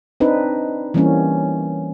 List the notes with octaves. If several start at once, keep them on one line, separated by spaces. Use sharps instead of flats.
C4 D4 D#4 B4
E3 G3 A#3 C4 C#4